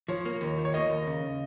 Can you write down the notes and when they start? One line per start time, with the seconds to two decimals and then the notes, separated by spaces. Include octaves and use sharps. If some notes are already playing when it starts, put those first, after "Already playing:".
0.08 F3 C#5
0.25 A#3
0.41 D#2
0.58 F3
0.65 C#5
0.74 A#3 D#5
0.90 D#2
1.07 C#3